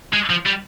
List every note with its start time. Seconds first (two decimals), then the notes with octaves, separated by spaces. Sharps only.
0.13 G#3
0.30 F3
0.46 G3